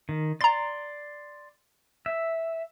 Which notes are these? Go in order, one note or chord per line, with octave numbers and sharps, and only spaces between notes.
D#3
D5 A#5 C6 A6
E5